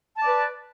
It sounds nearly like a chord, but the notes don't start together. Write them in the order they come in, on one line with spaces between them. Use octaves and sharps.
A5 D5 B4